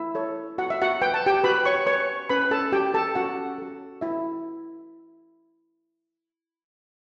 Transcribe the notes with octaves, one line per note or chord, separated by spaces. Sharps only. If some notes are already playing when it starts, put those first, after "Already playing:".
Already playing: E4 E5
A4 C#5
F#4 F#5
E5
F#4 F#5
B4 G5
A5
G4 G5
F#4 B4 B5
C#5 C#6
B4 C#5 C#6
C#4 B4 B5
A4 A5
F#4 G4 A4 G5
A4 A5
C#4 F#4 F#5
F#4 A4
E4 F#4 E5